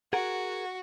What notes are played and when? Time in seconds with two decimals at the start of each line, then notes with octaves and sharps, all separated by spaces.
0.13 F#4 G#4 A#4 F#5